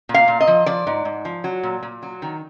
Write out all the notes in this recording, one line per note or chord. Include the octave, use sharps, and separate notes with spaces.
A#2
F5
A#2
D#5
F3
F3 D5
G#2
G#2
F3
F#3
A#2
A#2
F#3
D#3